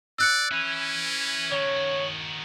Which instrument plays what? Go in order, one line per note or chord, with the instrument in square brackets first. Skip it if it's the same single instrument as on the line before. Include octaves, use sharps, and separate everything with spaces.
[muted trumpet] D5 [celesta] E6 F#6 C#7
[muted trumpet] C#4 [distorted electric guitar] E4 B4
[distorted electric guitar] D#3 F#4 [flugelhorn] C#5